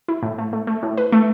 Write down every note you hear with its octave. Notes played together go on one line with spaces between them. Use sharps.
E4
A2
A3
A3
A3
A2
B4
A3